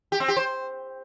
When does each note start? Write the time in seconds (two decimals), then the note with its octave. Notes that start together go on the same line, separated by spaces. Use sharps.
0.12 G4
0.20 C4
0.28 G4
0.37 C5